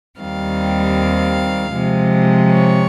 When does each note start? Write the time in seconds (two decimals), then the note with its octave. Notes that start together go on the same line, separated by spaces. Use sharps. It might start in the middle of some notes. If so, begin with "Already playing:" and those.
0.19 D#2 D#3 G3 C4 F5
1.73 C3 F3 G#3
2.51 C#5